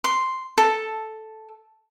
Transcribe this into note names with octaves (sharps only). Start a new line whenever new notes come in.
C6
A4